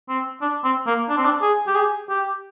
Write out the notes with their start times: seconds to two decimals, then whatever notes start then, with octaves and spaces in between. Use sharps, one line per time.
0.09 C4
0.41 D4
0.64 C4
0.87 A#3
1.09 D4
1.17 C4
1.25 D4
1.42 G#4
1.67 G4
1.76 G#4
2.09 G4